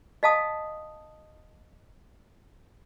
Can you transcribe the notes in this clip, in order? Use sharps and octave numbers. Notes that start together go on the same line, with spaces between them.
D#5 F5 A5 D#6